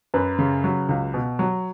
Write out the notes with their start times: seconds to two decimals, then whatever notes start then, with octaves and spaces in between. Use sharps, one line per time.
0.14 F#2 B4
0.38 C#3
0.64 F#3
0.89 C#2
1.14 B2
1.39 F#3